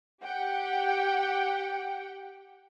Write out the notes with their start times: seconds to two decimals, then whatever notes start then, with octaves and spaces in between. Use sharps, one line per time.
0.23 G4 F#5 G5